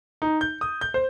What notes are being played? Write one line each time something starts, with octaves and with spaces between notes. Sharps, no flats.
D#4
G6
D#6
G6
C5